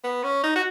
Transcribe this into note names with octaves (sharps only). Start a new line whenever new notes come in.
B3
C#4
D#4
F#4